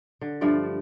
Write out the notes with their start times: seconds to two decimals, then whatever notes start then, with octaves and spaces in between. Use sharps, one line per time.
0.21 D3
0.41 G2 F3 A3 D5